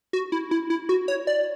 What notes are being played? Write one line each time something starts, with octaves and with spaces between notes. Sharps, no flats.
F#4
E4
E4
E4
F#4
C#5
D5